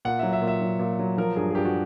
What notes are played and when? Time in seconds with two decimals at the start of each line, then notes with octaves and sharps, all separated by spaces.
0.05 A#2 F#5
0.19 F#3 E5
0.33 E5
0.42 A#2
0.47 E5
0.61 F#3
0.79 A#2
0.99 F#3
1.18 F3 A#4
1.36 G2 G#4
1.50 G#4
1.55 G2 G4
1.65 F#4